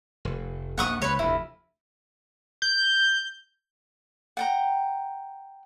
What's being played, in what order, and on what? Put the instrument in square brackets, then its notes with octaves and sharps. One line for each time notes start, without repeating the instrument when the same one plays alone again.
[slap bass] F1
[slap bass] A#1 D#2 [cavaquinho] F#5 C#6 D#6
[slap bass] C#2 [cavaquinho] B4 C#5
[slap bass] F1 D2 [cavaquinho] E4
[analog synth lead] G6
[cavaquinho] F#5 G5 A#5